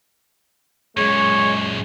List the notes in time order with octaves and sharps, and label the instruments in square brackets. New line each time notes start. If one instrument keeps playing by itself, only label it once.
[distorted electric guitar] F#2 A#2 [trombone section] G#3 [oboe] C#5